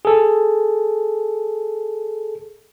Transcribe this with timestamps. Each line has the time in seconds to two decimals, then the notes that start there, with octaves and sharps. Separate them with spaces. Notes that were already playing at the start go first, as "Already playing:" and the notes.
0.05 G#4 A4